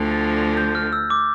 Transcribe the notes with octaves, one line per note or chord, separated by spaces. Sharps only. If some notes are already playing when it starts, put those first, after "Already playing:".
Already playing: D2 D3 F3
A6
A#6
G6
F6
E6
D6